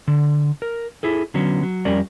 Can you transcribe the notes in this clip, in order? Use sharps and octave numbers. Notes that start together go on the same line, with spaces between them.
D3
A#4
E4 G#4 A4
D3 F#3 B3 C#4
F#3
F2 G3 C#4 A#4 D5